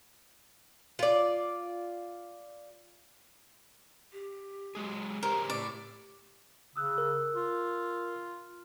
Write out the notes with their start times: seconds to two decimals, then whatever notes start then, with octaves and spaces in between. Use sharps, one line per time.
0.99 F4 D5
4.13 G4
4.75 F#3 G#3 G#4
5.23 C#3 G4 A#4 C5 C#5
5.50 A2 D5
6.76 C#3 D#6 E6 F#6
6.98 A#4
7.35 F4